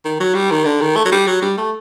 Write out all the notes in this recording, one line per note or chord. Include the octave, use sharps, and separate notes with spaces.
D#3
F#3
G3
D#3
D3
D#3
A3
F#3
G3
F#3
G3
A3